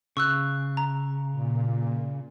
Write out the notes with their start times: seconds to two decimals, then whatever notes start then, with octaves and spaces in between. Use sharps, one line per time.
0.17 C#3 C#6 E6 F#6
0.77 A#5
1.32 A#2